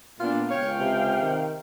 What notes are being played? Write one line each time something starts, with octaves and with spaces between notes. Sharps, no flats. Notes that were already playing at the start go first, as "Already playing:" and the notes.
A#2 B3 D4 F4
C#2 C#5 F5 G5
C3
D#3